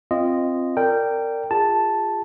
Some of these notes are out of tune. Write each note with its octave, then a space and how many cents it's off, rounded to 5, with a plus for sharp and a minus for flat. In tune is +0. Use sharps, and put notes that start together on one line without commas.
C4 +5 F4 -15 D#5 -10
A#4 -25 D5 +0 G5 +0
F4 +0 G#4 -25 A5 +0